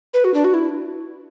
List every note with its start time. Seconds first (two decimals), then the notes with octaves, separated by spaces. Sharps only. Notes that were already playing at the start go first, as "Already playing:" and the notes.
0.14 B4
0.24 F#4
0.34 D4
0.44 F#4
0.54 E4